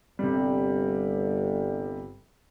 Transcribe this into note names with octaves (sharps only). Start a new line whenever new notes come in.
G1 C3 G3